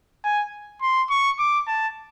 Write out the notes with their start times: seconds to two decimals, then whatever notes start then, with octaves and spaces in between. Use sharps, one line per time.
0.24 G#5
0.82 C6
1.10 C#6
1.39 D6
1.68 A5